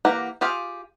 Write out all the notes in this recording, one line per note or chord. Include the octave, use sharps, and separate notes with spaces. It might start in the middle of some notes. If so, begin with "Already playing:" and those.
E3 A#3 G4 F#5 A#5
F4 G4 G#4 F5